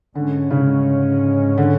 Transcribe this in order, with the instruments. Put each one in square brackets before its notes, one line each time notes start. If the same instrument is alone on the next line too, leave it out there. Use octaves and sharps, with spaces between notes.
[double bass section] G#2 G#3 C#4 [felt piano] D3
[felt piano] C#3
D3